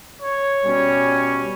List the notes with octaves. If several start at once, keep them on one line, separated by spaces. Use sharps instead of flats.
C#5
B2 G3 C#4